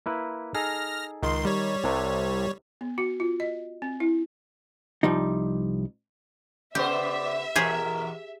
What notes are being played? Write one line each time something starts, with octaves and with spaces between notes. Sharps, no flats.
A#3 E4 B4
D#4 G#4 A4 F6 A#6
C#2 D#3 C6
G3 C#5
C2 C3 A5
B3
F#4
F4
D#5
C4
E4
C2 F3 G3 D#4
C#3 B3 G4 C5 D5 E5
E2 B2 G4 G#4 A#4 C#5